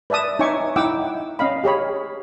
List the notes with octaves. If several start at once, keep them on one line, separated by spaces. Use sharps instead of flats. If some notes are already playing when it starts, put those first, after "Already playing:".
B4 D5 E5 A5 D#6
D#4 C#5 E5 G#5 C#6 D6
D#4 E4 F#5 G5 D6 E6
C#4 D#5 F5 B5
G4 G#4 C#5 B5